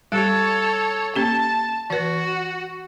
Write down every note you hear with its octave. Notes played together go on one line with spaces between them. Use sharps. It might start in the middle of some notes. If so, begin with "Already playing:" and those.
G3 G4 A4 C#5
A#3 C#4 G4 A5
E3 F#4 B4